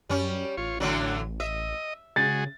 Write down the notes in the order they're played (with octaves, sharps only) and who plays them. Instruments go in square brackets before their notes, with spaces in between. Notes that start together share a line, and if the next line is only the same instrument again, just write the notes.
[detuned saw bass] F#2 [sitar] G3 C#4
[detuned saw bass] A1 [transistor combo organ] F4 C#5
[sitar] A2 D3 F#3 [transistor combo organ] D4
[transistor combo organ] D#5 [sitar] E5
[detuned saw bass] C#3 [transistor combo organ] G#3 F#4 G#4 [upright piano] A6